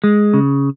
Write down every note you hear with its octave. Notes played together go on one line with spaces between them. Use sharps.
G#3
C#3